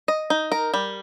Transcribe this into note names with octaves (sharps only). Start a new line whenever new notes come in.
D#5
D#4
A#4
G3